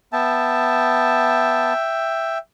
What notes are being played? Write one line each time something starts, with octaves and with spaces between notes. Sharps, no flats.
B3 E5 G5 A5